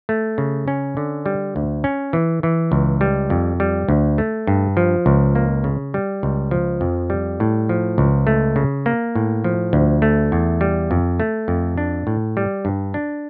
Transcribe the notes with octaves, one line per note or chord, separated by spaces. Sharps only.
A3
C#3
C#4
D3
G3
D2
C#4
E3
E3
C#2
G3
F2
G3
D2
A3
G2
F3
C#2
A#3
C#3
G3
C#2
F3
F2
G3
A2
F3
C#2
A3
C#3
A#3
A2
F3
D2
A3
E2
G3
F2
A3
F2
D4
A2
G3
G2
D4